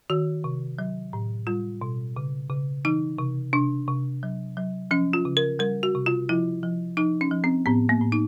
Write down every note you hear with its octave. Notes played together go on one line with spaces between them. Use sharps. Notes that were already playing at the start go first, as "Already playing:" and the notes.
D#3 F#4
C3
F#3
A2
G3 F4
B2
C#3
C#3
E3 D#4
C3
C3 D4
C3
F#3
F#3
F3 C#4
F4
C#3
A#4
G3 A#4
F#4
C3
F4
F3 E4
F3
F3 D#4
C#4
F3
C4
A2 B3
A#3
A2
D#4